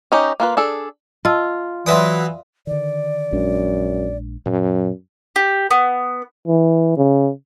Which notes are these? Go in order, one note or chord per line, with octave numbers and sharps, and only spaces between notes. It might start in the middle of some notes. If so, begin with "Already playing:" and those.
C#4 D#4 G4
A#3 F4 B4
D4 G#4 A4
F4 D#5 A5 E6
E3 F#3 B4 D5 E5 C6 D#6
D3 D#3 D5
A#1 F#2 G#3 D4
F#2 A#2 F#3
G4
B3
E3
C#3